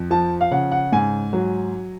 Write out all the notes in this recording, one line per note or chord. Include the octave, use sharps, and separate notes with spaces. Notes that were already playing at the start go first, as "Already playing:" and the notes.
Already playing: F2
F3 A5
F5
C#3 F#5
F#5
G#2 G#5
F#3